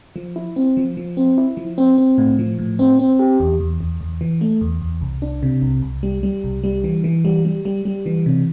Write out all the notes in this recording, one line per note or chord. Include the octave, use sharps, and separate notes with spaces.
F3
E4
C4
F3
F3
C4
E4
F3
C4
C4
A2
F3
A2
C4
C4
G4
E2
E2
E2
E2
E3
A3
E2
E2
C2
D4
C3
C2
C2
G3
G3
C2
G3
E3
E3
G3
G3
G3
G3
E3
C3